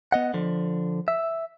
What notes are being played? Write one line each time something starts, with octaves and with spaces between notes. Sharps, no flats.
B3 D#5 F#5
D3 F3
E5